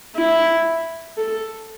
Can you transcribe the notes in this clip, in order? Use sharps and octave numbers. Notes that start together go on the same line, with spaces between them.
E4
A4